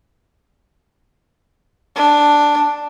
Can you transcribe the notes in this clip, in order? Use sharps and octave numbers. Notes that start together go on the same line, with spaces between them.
D4